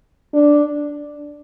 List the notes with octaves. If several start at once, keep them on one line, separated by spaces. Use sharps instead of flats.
D4